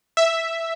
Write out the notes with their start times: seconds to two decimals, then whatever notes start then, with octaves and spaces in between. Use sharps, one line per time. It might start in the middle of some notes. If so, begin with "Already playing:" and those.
0.17 E5